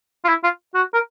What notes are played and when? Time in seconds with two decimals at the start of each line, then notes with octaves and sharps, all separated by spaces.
0.24 F4
0.29 E4
0.44 F4
0.75 F#4
0.94 A#4